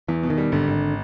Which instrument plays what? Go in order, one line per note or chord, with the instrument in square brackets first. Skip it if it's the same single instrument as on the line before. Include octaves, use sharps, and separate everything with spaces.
[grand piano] E2 [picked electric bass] E3
[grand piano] B2
[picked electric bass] D#3
[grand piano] G3
[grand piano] G#1 [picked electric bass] D3
[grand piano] G#1